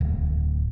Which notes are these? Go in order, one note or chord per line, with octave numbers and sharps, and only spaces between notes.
D1